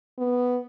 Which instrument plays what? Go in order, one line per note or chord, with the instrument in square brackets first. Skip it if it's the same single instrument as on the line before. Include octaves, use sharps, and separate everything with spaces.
[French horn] B3